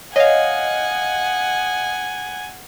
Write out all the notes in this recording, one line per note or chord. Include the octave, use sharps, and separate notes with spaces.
C#5 D#5 F5 F#5 G#5